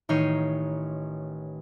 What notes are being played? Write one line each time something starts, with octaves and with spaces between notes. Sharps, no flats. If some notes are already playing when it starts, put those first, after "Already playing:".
A1 D#3 D#4 C#5 C7 D#7